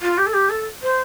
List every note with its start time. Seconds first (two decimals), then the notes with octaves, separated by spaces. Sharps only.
0.02 F4
0.17 G4
0.26 A4
0.33 G4
0.49 A4
0.82 C5